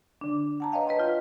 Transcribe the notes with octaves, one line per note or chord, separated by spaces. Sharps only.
D3 D4
F#5 A5 A#5
B4 C#5 D#5 F5 G5
B4 D#5 A5 C6
F4 G6